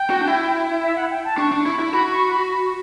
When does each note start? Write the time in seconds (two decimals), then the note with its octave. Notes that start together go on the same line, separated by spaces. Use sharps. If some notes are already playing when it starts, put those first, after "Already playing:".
Already playing: G5
0.10 F#4
0.21 D4
0.27 E4
0.83 E5
0.96 F#5
1.10 G5
1.25 A5
1.38 D4 C#6
1.52 D4
1.66 E4
1.79 E4
1.93 F#4 B5
2.11 C#6
2.29 B5